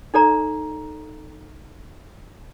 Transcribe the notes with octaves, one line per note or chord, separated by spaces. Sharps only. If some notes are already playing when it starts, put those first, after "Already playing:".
D#4 A4 D5 A#5